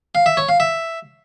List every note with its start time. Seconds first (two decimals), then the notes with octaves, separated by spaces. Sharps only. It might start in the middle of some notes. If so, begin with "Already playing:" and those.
0.15 F5
0.26 E5
0.37 C#5
0.49 F5
0.60 E5